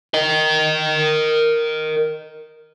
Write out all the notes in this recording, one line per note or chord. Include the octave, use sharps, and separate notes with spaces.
A#4 D#5